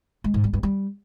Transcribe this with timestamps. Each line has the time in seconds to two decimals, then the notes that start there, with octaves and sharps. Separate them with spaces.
0.24 G#3
0.34 G#2
0.44 G3
0.53 G2
0.63 G3